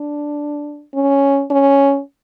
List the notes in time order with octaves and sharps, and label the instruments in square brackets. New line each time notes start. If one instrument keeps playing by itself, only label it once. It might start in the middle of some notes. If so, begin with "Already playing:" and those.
Already playing: [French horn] D4
C#4
C#4